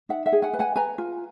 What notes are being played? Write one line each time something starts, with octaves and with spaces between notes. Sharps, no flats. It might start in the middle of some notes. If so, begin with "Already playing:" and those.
D#4 E5 F#5
E5 F#5
G#4
F#5 G#5
B4
F#5 G#5
B4 G#5 A#5
F4